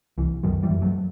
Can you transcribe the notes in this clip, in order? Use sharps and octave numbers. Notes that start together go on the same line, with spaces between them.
C2 E3
F#2 D#3 F#3
E3 G3
F#2
F#3 A3